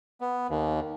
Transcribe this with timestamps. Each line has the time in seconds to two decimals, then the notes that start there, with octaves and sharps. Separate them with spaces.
0.21 B3
0.50 D#2